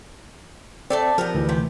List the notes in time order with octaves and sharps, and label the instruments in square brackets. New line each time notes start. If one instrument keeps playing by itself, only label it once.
[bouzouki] A3 A4 D5 [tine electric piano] C4
[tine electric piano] F3 [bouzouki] B3 G4 A#4
[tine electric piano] D2 E3
[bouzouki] C3 G4